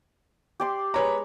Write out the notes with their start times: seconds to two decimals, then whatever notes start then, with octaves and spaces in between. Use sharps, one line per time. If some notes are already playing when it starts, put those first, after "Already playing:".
0.60 G4 D5 C6
0.94 G#3 B4 C#5 A#5 C#6